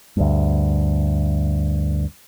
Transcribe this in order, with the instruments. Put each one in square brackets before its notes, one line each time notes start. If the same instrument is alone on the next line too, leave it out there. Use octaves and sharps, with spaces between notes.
[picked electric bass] D2 G2